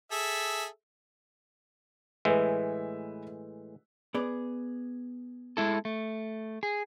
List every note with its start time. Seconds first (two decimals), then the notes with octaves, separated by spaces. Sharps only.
0.12 G#4 A4 E5
2.25 A2 E3 G#3 B4 E5
4.14 B3 G#4 D5
5.57 G#3 E4 A4
5.85 A3
6.63 G#4